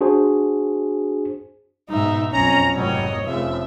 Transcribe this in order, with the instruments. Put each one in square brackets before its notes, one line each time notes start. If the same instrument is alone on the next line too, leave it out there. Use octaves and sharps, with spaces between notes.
[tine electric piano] D4 F#4 G#4 C5
[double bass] G#2 B2 [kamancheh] D#4 E5
[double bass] B1 F2 [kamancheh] C#4 [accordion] A#5
[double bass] F1 G#2 [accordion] F#3 G3 [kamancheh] C#5 D#5
[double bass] F1 F3 [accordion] C#3 [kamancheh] E5